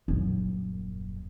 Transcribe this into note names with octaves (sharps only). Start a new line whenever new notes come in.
D#1 F#2